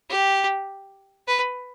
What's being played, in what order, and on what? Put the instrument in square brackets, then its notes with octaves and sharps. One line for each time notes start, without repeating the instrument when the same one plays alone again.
[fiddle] G4
B4